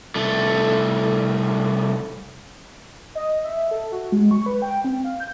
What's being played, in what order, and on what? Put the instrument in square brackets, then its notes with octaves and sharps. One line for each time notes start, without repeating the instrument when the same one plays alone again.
[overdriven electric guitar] C2 A3
[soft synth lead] D#5
E5
A4
F#4
G#3
C#6
B4
G5
C4
F5
G6